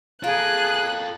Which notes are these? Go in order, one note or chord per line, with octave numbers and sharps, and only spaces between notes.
A#3 F4 G#4 A4 F#6